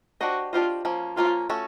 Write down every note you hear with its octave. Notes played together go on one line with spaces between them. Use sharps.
D4 F#4 G4 C5 D#5
D4 F4 G4 C5 D#5
F3 A#3 C#4
F3 A#3 C#4 F4
A3 C#4 F#4 A4